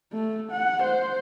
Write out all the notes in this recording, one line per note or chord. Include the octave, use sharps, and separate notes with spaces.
A3
F#5
C5